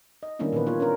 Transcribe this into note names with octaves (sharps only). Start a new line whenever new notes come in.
D#5
D#3 G3 A#3 C#4 D4 E4
A#2 D#3 E3 B3 B4
A#3 F4 C#5
C#4 D4 A#4